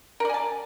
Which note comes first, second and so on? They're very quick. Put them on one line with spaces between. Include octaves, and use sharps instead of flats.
A#4 D5 G#5 A5